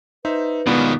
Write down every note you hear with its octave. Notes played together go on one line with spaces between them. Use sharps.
D#4 B4 C5 E5
B2 D#3 G#3 B3 F4 D5